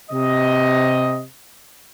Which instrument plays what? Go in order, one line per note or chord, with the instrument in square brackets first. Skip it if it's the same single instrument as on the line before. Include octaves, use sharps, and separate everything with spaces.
[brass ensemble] C3 D#5